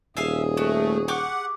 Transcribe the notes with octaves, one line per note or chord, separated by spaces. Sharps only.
D#1 G#4 E5 F5 G#5
A3 F#4
G4 F#5 C#6 D6